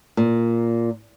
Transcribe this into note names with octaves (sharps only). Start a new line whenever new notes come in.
A#2